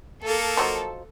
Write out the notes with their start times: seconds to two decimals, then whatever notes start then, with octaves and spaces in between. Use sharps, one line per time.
0.24 A#3 A4
0.57 F3 F#3 D#4